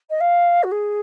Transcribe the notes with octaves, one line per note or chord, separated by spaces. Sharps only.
D#5
F5
F#4
G#4